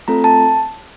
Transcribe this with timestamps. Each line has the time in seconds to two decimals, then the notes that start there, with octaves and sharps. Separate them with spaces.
0.08 A3 C4 F4 A4 A#5
0.24 A5